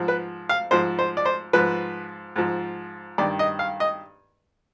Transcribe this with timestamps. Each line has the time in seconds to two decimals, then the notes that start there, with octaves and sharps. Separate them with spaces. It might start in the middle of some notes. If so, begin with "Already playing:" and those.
Already playing: G#2 F3
0.08 B4
0.49 F5
0.71 G#2 F3 C5
0.99 C5
1.17 D5
1.25 C5
1.53 G#2 F3 B4
2.36 G#2 F3
3.18 G2 D#3 D5
3.39 D#5
3.59 F5
3.80 D#5